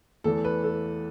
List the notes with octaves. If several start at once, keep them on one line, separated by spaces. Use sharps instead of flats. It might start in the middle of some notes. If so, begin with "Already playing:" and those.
E2 E3 A3 A4
B4
A4